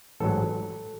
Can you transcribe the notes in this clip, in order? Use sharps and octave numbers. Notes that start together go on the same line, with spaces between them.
A1 G#2 F#3 A4